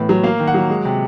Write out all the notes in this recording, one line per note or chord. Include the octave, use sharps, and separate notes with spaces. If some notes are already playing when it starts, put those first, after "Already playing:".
Already playing: A2 E3 B3
F#3
A#3 F5
D#3
F#5
F#3
G#3
C3